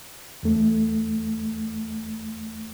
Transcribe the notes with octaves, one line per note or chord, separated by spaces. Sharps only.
E2 A3